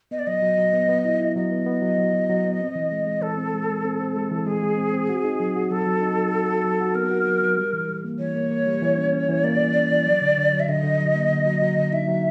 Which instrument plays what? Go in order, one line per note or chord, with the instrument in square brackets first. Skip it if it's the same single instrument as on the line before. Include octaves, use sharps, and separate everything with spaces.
[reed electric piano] B3 [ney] D#5
[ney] D5
[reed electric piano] F#3 [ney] D#5
[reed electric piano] F#3
F#3
B3
B3
E4
E4
[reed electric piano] F#3 [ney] D#5
[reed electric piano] B3
B3
F#3
F#3
F#3
F#3
B3
C4
E3
G#3
G#3
[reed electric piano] E3 [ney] A4
[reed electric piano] C4
G#3
G#3
C4
C4
G#3
E3
[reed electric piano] G#3 [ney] G#4
[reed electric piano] G#3
C4
C4
F#4
D#4
F#3
F#4
[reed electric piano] F#3 [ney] A4
[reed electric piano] F#3
D#4
F#3
F#4
F#4
F#3
F#4
[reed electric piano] B3 [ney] A#4
[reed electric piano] F#4
F#3
F#3
G3
E3
G3
A#3
[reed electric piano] E3 [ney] C#5
[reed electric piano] A#3
A#3
G3
E3
C#4
C#4
E3
[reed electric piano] A#3 [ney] D5
[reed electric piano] E3
C#4
E3
F#3
D3
D3
F#3
[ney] E5
[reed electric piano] D3 [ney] D#5
[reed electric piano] D3
F#3
A#3
D3
F#3
F#3
D3
[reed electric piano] D#4 [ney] E5
[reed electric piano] F#3